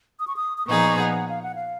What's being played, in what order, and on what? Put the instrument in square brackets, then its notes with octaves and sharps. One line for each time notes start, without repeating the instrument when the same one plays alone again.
[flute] D#6
C#6
D#6
D#6
[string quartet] A#2 F3 B3 D#4 G#4 [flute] C#6
[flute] F#5
F5
F#5
F5